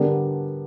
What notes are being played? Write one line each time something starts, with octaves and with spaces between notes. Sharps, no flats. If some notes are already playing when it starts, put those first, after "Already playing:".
Already playing: D3 G3 B3 D4 A#4